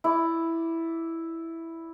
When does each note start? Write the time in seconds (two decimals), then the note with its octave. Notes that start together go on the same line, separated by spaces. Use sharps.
0.04 E4 D5